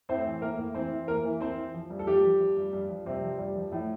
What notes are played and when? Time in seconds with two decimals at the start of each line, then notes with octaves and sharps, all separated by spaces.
0.09 A2 C4 C5
0.26 E3
0.42 A2 A#3 A#4
0.58 A2
0.75 E3 C4 C5
0.92 E3
1.08 E3 A#3 A#4
1.25 E3
1.41 E3 C4 C5
1.57 E3
1.74 F3
1.90 G2
1.99 A4
2.07 F3 G3 G4
2.24 F3
2.40 F3
2.57 G2
2.73 G2
2.89 F3
3.06 G2 C3 C4
3.23 F3
3.39 G2 G3
3.56 F3
3.71 A2 F3 A3